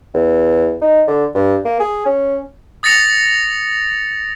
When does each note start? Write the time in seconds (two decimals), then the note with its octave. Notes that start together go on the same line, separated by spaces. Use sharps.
0.14 E2
0.82 D#4
1.08 D3
1.35 G2
1.65 A#3
1.80 G#4
2.05 C#4
2.83 D#6 A6 A#6 C#7 F7